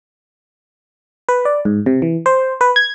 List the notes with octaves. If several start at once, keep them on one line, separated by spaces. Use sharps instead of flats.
B4
D5
G#2
C3
E3
C5
B4
G#6